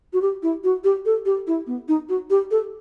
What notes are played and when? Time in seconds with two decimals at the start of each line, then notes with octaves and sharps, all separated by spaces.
0.13 F#4
0.22 G4
0.43 E4
0.64 F#4
0.84 G4
1.06 A4
1.26 G4
1.47 E4
1.67 B3
1.88 D#4
2.09 F#4
2.30 G4
2.51 A4